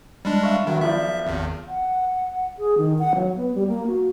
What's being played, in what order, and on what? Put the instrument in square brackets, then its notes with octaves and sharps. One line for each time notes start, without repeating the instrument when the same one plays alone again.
[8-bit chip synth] G3 G#3 D4
[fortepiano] E5 F5 C#6
[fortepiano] B1 F#3 [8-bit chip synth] D#3
[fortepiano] B1 F3 D5 [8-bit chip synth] E5
[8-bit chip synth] G#1 E2
[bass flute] F#5
G#4
D#3
F#5
F#3
B3
G3
A#3
F#4